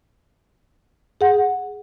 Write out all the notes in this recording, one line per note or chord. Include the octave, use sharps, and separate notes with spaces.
G#4 F#5